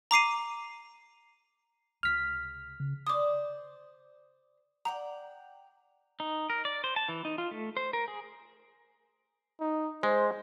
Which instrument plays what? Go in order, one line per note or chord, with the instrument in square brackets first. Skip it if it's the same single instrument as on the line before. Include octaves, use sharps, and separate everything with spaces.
[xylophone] A#5 D6 C7 D#7
[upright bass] C#2 C3 [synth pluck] F6 B6
[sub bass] C#3
[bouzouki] C5 D5 [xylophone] D6 D#6
[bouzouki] D5 F#5 G5 [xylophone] A#5
[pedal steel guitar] D#4
A#4
D5
C5
A5
E3
D#4
F4
A3
C5
A#4
G#4
[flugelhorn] D#4
[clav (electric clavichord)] G#3 [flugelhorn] C5